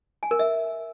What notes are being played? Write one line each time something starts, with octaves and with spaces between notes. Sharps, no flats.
G#5
A#4
E5